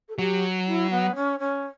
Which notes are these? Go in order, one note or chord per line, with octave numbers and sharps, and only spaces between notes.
A4
F#3 G4
E4
B3
C#4
C#4